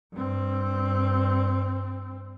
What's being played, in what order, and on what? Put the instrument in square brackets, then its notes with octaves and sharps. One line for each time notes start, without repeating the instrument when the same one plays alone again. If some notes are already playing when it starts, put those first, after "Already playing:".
[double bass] G2 C4